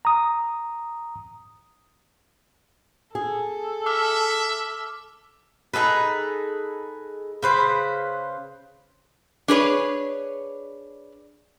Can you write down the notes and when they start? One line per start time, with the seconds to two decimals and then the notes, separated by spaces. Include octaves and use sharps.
0.05 A#5 D#6
3.15 G#4 A4
3.86 E5 D6 E6 F6
5.74 D#4 G#4 A4 B4
7.43 C#3 B4 C5
9.48 D4 G#4 B4 C#5